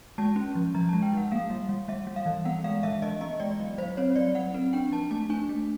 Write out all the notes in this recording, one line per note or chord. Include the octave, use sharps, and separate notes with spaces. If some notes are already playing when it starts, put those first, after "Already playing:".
G#3 A5
C#4
F3
F3 A#5
A5
G#3
G5
F3 F#5
A#3 F5
G3
G3
G3 E5
G3
F5
E3
B3 F#5
G#3 F5
E3 E5
E3 D#5
B3 D#5
G#3 D5
F#3
F#3 C5
C4 C#5
F#3 D5
F#3 F#5
C4
D4 G5
F3 A5
A3 A5
D4 G#5
A3